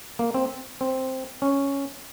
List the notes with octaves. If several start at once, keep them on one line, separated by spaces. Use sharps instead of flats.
A#3
C4
C4
C#4